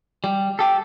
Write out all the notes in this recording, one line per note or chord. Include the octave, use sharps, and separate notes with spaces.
G3
G4 A4